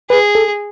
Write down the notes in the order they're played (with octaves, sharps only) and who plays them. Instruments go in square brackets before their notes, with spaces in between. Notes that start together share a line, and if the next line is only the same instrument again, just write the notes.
[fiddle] G#4 [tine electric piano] B4
[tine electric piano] A4